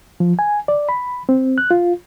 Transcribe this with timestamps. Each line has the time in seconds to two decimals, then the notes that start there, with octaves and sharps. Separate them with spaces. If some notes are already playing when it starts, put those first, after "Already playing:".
0.20 F3
0.39 G#5
0.68 D5
0.89 B5
1.29 C4
1.58 F#6
1.71 F4